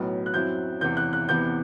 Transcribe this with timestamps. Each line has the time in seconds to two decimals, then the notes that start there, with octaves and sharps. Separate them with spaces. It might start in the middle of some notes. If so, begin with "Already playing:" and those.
Already playing: B1 A2 F#3 B3
0.26 F#6
0.34 F#2 F#3 C4 E4 G6
0.81 E2 C3 E3 G6
0.97 F#6
1.13 F#6
1.28 E2 C3 E3 B3 G6